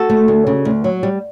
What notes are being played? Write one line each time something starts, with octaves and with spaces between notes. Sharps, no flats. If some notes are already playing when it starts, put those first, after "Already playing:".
Already playing: F#4 A4
A3
D2
C#3
D2
F#3
G3